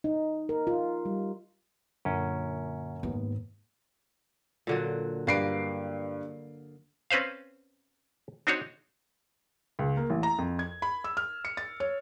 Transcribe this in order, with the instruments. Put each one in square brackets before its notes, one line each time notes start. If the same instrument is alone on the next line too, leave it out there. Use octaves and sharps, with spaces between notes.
[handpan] D#4
A#4
F4
G3
[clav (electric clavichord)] F#2 C#4 [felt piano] A#2 D3
[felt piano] D#2 B3 [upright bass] G#2
[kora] A#2 D3 F#3
[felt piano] G2 C7 D7 [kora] A#3 B4
[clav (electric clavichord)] C4 C#4 B4 C5 F5
C4 D4 D#4 F#4 C#5
[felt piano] C#2
A#3
A1
A#5
F2
G#6
B5
E6
F6
C#7
A6
C#5